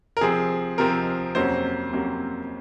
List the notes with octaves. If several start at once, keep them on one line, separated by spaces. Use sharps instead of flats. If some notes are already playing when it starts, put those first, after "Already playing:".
A#4
C3 F3 C4 G#4
C3 F3 C4 A#4
F2 C3 F#3 A#3 C#4 C5
F2 C3 F#3 A#3 C#4